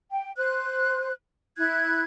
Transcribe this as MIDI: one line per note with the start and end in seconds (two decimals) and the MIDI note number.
0.11 0.32 79
0.37 1.12 72
0.37 1.12 90
1.57 2.03 64
1.57 2.03 90
1.57 2.03 92